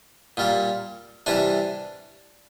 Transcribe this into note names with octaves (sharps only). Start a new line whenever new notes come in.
A#2 G3 A#3
C3 E3 G3 D4